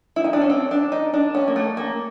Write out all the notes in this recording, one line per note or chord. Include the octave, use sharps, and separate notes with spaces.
E4
D#4
D4
C#4
C4
D4
D#4
D4
C#4
A#3
A3
A#3